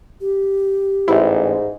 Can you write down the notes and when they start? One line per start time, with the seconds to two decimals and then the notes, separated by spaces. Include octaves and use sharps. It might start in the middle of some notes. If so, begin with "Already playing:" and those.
0.21 G4
1.08 A1 G#2 E4